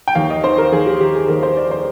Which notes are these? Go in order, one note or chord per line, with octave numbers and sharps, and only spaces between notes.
G5
D#2 F5
D#5
D#3 C5
A#4
D#2 G#4
G4
D#3 G4
G#4
D#2 A#4
C5
D#3 D5
C5